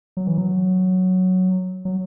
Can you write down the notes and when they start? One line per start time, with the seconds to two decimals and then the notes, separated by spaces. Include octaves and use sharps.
0.17 F#3
0.27 E3
0.38 F#3
1.85 F#3